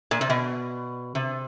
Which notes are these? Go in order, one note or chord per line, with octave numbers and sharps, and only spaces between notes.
A#2
C3
B2
C3